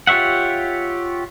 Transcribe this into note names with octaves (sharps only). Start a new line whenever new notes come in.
F4 G4 C#5 E5 F#5